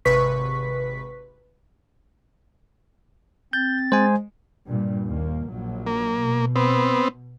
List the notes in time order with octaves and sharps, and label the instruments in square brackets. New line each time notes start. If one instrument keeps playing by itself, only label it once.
[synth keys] G#1 C3 B4 C#6 B6
[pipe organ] C4 A6 [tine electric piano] G6
[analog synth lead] G#3 [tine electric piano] C5 G#5
[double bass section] G2 A#2
D#2 A#3
A#1 F#3
[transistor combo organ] A#3
[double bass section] B2
[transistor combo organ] B3 C4